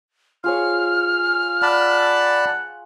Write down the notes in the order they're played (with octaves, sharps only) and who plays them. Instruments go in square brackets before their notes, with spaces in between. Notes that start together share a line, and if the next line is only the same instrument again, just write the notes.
[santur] F4 G#4 C#5 [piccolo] F6
[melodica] D5 A5 B5 [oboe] F#5